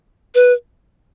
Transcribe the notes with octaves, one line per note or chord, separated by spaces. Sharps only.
B4